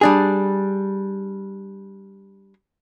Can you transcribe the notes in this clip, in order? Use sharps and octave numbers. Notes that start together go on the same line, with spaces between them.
G3 D4 G#4